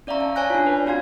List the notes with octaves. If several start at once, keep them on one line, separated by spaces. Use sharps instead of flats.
C#4 D5 E5 F5 A#5 C#6
A5
C#5 D5 G#5 A5 F#6 A#6
D4 F4
B4
C4 F4 F#4 F5 C6 G#6